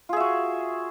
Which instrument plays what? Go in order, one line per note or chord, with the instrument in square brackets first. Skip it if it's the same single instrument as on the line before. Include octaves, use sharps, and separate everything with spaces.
[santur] F4
G#4
E5
F#4